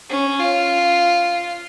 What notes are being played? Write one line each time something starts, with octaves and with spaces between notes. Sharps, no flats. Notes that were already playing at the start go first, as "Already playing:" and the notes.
C#4
F4